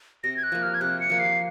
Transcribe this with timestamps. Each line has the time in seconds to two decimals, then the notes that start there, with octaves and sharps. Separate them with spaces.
0.24 C3 A#6
0.37 G#6
0.43 F#6
0.52 F3 A#3
0.63 F6
0.74 G#6
0.81 C3 F#6
1.00 C#7
1.10 F3 A#3
1.19 C7